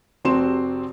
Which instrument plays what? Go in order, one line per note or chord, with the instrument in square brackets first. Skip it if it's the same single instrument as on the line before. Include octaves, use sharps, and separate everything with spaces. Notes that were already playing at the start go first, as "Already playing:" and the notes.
[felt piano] F1 C3 C4 F#4 C6 E7